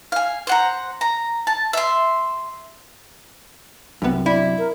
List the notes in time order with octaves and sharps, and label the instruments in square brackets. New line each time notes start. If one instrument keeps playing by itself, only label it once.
[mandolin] F5 G#5
C5 F#5 A#5
A#5
A5
E5 C6
[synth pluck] C2 B3 [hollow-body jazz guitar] F#2 C3
[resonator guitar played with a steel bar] E4 [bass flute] D5
[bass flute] A#4